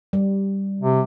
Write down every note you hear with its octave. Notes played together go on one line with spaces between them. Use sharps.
G3
C3